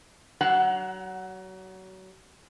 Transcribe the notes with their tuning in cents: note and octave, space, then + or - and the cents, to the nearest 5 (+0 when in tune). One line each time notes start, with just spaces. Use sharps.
F#3 +30 F#5 +0